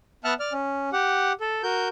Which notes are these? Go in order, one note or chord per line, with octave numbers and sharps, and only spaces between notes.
B3 E5 F#5 A5 F6 F#6
D5 F6
C#4
G4 F#5
A4
F#4 A#4 G6